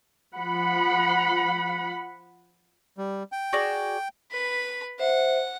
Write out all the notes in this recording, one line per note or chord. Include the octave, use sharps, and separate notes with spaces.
F3 F#5 B5
G3
G5
F#4 G#4 D5
B4 B5
C5 E5 F#5